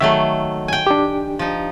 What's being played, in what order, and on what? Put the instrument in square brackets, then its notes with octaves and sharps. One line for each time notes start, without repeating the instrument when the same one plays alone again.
[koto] D#3 F#3 A3 [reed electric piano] E5
[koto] G5 G#5
[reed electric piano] D4 G4
[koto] F3 D#4